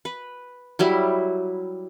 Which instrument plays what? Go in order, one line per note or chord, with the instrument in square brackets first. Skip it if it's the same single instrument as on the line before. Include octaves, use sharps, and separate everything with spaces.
[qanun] B4
F#3 G3 E4